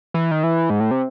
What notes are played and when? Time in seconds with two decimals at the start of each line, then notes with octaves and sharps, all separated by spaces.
0.14 E3
0.31 D#3
0.43 E3
0.70 G#2
0.80 A2
0.91 C3